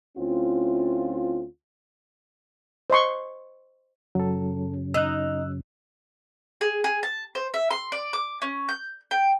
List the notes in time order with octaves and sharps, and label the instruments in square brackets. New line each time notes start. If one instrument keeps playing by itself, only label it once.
[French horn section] D2 C4 C#4 E4 F4
[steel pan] C5 D#5 C6 C#6
[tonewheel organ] F#2 C#3 [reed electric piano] F#3 A4
[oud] D#4 [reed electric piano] E6 F#6
[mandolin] G#4
G#4
A5
C5
E5
C6
D5
D6
C#4
G6
G5